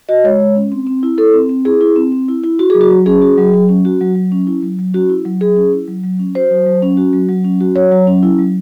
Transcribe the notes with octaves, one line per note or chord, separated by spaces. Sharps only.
F#4 D#5
G#3 C#5
G#3
C#4
C4
C4
E4
E4 A4
C4
C4
E4 G#4
E4
C4
C4
E4
E4
F#4
F#3 G#4
F#4
F#3
C#4 G#4
F#4
F#3
F#3
C#4
F#4
F#3
F#3
C#4
E4
F#3
F#3
C#4 F#4
E4
F#3
F#3 G#4
C#4
E4
F#3
F#3
C#4
F#4 C5
F#3
F#3
C#4
F#4
F#3
F#3
C#4
F#4
F#3 C#5
F#3
C#4
E4
F#3